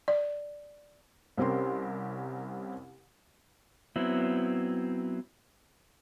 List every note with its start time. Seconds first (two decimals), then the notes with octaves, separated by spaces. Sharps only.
0.08 D5
1.37 C2 C4 C#4 G4 A#4 C6
3.96 F#3 B3 C4 E4